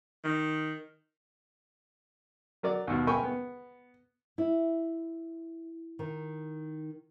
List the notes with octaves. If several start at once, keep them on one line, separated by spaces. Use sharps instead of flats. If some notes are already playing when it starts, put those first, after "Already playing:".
D#3
F#3 A#4 D5
D#2 B2
A#4 G5 G#5 B5 C#6
B3
E4
D#3